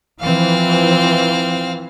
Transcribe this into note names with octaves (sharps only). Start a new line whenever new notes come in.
E3 F3 C4 F5